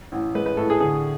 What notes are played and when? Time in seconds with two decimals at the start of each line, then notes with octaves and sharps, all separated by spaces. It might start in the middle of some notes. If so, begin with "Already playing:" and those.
0.12 A1
0.35 G#3 B4
0.46 B4
0.57 A2 A4
0.70 G#4
0.80 D3 G#4